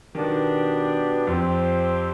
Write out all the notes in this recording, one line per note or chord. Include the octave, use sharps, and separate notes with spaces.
B2 D#3 B3 D4 G4
F2 F3 C4 G4 C5